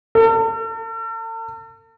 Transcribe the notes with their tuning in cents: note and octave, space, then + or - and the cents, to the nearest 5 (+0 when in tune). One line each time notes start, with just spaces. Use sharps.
A4 +45